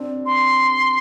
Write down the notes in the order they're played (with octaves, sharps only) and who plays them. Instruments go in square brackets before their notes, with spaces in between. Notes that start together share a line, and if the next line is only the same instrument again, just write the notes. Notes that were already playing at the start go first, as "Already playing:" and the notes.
Already playing: [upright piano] C4 D4
[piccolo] C6